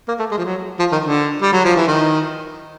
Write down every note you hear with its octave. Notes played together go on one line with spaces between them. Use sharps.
A#3
A3
G#3
F3
F#3
F3
D#3
D3
G3
F#3
F3
E3
D#3